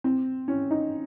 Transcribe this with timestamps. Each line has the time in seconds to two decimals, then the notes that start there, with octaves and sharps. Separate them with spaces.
0.04 C4
0.48 C#4
0.71 D#4